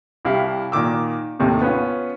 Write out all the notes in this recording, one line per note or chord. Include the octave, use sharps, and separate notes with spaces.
C2 E4 G4 F5
A#2 D#3 D6 E6
D#2 A2 C3
B3 C#4 F4